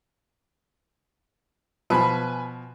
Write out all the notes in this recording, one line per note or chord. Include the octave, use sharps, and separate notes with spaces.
B2 F3 B4 G#5 B5